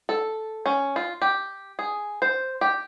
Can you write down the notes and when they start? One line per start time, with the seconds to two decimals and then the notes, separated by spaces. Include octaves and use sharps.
0.09 A4
0.66 C#4
0.96 F4
1.22 G4
1.79 G#4
2.22 C5
2.61 G4